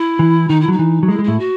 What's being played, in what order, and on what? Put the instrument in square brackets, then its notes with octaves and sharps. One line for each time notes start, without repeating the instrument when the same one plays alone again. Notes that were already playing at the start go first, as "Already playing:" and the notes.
Already playing: [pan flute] E4
[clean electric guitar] E3
[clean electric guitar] D#3 [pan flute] D#4
[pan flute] E4
[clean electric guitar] F#3 [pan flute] D#4
[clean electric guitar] E3
F#3
[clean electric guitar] G#3 [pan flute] E4
[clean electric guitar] G#3
[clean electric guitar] A2 [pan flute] E4
[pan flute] F#4